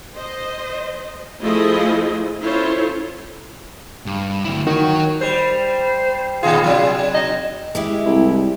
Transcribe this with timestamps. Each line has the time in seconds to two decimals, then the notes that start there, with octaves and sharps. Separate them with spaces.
0.15 C5 D#5
1.42 F3 A3 E4 G#4 C5 D#5
2.42 C#4 E4 F4 A4 C5 C#5
4.06 G2
4.44 D2 E4
4.67 D#3 F#4 C#5
5.21 G3 C5
6.43 A#2 D#3 F4 G#4
6.64 B2 F#3
7.14 D#5
7.75 G#3 E4 G4
8.05 C2